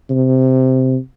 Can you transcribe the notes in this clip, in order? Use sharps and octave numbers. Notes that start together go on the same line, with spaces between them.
C3